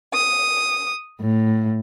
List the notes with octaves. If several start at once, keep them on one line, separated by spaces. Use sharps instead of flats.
D#6
A2